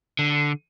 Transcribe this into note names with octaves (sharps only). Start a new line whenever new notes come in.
D3